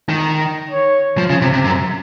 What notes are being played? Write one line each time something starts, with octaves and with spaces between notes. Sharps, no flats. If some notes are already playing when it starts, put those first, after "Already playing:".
D#3
C#5
F3
C#3
C3
C3
F#2